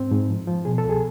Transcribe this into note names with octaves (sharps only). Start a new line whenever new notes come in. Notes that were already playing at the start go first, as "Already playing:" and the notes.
Already playing: G#2 C4
G#2
F3
F3
B2 G#4
A4
C2
G#4